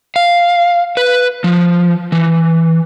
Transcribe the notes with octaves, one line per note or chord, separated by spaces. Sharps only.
F5
B4
F3
E3